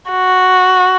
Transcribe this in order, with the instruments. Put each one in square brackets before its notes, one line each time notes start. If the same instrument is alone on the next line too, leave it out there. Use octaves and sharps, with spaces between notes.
[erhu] F#4